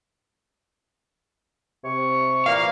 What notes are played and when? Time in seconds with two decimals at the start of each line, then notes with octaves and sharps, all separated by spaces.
1.84 C3 C#6
2.46 A#2 E3 A#3 F5